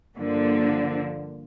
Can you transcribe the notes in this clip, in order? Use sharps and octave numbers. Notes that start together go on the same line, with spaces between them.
G2 D3 F3 A#3